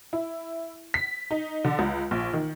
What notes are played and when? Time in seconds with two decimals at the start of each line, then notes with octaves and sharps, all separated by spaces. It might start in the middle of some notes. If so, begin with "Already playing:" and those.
0.13 E4
0.94 B6
1.31 D#4
1.64 D3
1.79 C#2
2.11 A#1
2.33 D#3